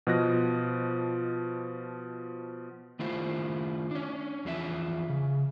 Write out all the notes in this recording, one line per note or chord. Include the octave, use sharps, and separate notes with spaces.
B2 F3 D#5 F#6 A#6
D#3 A3 E4 F4 C5
C#4 D4
E2 F3 D4 E5
C#3